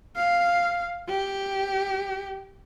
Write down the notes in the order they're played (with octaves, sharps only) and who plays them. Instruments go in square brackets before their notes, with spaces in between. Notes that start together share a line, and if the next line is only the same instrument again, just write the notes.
[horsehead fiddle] F5
G4